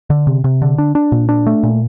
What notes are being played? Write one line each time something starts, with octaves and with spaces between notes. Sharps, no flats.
D3
C3
C3
D3
D4
D4
A#2
D4
A3
A#2